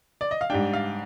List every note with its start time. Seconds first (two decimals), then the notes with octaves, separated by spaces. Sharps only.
0.21 D5
0.31 D#5
0.41 F5
0.50 G#2 G3 D4 G5
0.73 F5